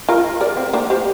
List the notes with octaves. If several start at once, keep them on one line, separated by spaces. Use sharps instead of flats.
F4 A#4
A#4 D5
C4
A#3 D4
G4 C5